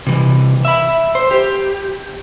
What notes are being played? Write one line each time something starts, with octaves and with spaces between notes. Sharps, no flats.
C3 E3
E5 B5
C5
G4